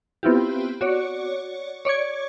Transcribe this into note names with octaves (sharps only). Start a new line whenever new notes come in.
B3 C4 E4 F4 G4
F#4 C#5 D5
C#5 D5 C#6 G#6